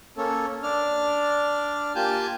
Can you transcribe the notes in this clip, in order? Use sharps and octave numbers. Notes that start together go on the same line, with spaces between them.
A#3 C#4 A4
D4 D5 F6
A#3 F4 G4 G#5 A5 G6